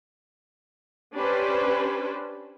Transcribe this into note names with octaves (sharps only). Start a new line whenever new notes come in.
C#4 D4 G4 B4 C5